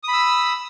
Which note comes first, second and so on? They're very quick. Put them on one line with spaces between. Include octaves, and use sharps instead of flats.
D#6 B5 E6